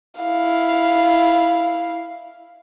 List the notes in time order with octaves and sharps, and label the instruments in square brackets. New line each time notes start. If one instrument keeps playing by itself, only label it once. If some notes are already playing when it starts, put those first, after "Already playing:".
[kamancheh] E4 F5